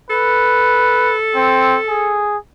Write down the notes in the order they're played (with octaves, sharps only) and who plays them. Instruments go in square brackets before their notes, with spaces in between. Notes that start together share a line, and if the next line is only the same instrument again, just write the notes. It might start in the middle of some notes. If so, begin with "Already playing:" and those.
[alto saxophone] A4 [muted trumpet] B4
[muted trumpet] C4
G#4